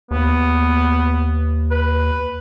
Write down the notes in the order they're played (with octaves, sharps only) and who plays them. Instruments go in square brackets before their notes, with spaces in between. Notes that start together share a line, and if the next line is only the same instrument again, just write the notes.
[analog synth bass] D#2 [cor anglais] B3
[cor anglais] B4